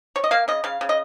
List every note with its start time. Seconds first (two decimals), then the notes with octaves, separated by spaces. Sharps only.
0.16 C#5
0.24 D#5
0.31 A#3 F5
0.48 C#3 D#5
0.64 C#3 F5
0.81 C#3
0.89 D#5